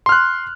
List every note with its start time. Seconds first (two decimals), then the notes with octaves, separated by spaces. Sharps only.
0.06 C6
0.09 F6
0.12 F#6